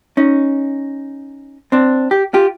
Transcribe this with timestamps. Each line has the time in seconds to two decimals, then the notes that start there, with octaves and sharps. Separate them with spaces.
0.17 C#4 D#4
1.72 C4 D4
2.11 G4
2.34 F4 G4